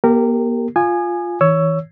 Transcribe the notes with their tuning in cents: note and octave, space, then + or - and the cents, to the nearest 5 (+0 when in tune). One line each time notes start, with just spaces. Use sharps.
A#3 +40 G4 +0 A#4 -20
F4 +0 G#5 +0 D#6 -40
E3 -30 C#5 +10 E6 +10